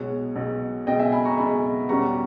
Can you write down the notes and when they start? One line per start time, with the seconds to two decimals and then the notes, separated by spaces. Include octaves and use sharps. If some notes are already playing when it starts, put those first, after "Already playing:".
Already playing: B1 B2 G#3 C#5
0.36 B1 B2 G#3
0.87 B1 B2 G#3 D#5 G5
0.99 E5 G#5
1.12 G#5 B5
1.25 A#5 C#6
1.38 B1 B2 G#3 G#5 B5
1.89 E2 B2 G3 C#4 A#5 C#6